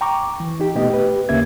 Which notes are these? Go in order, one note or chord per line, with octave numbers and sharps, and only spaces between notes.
G5 A#5 C#6 D6
E3
D#4 G4
B2 A3 B3 G4 D#5
G4 B4
D#2 C#3 A#3 C#4 E5 G#6